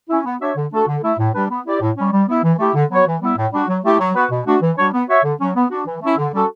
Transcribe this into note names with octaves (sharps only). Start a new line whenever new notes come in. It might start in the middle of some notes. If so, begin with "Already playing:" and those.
C#4 E4
B3
D4 F#4 C#5 E5
D3
A3 D4 F#4 A4
D3
A3 E4
A2
G3 D4 G4 B4
B3
E4 G4 D5
A2
G3 C#4
G3
B3 E4
E3
A3 E4 G4
D3
F#3 B3 F#4 C#5
E3
G3 B3 E4
A2
G3 D4 F#4
F#3
A3 E4 G4
F#3
B3 F#4 B4
B2
A3 D4 F#4
E3
G3 D4 F#4 C#5
B3
F#4 C#5 E5
D3
F#3 C#4
B3
D4 F#4
E3
A3 C#4 E4
D3
G3 C#4 F#4 A4